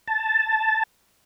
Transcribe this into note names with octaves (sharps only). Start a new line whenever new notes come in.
A5